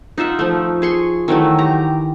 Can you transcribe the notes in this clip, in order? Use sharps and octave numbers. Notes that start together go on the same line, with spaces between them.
D#4 F4 E5 F#5
F3 A3
G#4 C6 C#6
D#3 E3 F#3 A3
G4 A#5